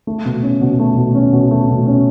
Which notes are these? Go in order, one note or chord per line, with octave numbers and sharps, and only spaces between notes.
A3
B2
C#4
B2
A3
B2
C#4
B2
A3
B2
C#4